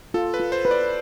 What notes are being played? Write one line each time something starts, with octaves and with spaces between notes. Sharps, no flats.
F4 A4
B4
F4
C5
B4
D5